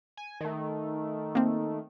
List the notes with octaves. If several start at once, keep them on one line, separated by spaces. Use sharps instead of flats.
G#5
D#3 A3
A#3 C4